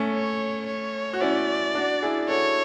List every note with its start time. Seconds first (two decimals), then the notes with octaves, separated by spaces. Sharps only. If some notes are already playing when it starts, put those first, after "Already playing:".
Already playing: A3 C#4
0.13 C#5
0.67 C#5
1.13 F#4
1.20 C#4 E4 D5
1.75 D4 F#4
2.02 E4 G#4
2.29 F#4 A4 C#5